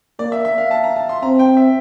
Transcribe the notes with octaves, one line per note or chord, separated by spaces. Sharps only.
A#3 D5
E5
E5
F5
A5
A#5
A5
C6
C4 A#5
G5
E5